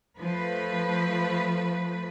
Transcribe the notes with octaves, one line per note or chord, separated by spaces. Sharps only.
F3 A3 B4